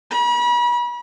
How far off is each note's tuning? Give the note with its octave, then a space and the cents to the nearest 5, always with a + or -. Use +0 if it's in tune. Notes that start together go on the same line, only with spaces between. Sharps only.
B5 -40